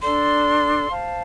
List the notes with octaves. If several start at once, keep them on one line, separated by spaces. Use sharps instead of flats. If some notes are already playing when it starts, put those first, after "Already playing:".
D4 A4 D5 C6
C5 F5 A5